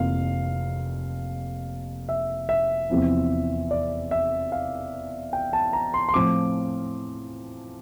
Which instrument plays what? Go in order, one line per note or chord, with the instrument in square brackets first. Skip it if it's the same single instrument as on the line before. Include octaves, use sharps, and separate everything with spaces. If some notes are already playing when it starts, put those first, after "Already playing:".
Already playing: [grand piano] F1 F2 E3 A#3 F4 F5
E5
E5
E2 C3 F3 C4 E4
D5
E5
F5
G5
A5
A#5
C6
C6
A2 F3 C4 F4 D6